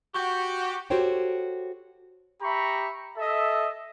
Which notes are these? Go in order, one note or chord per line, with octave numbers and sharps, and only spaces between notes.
F#4 G4 C#6 G6
F#4 G4 A4 C5 C#5 G5
G4 E5 A#5 B5 C#6
A4 D#5 E5